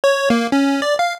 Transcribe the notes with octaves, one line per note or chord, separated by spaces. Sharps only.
C#5
A#3
C#4
D5
F5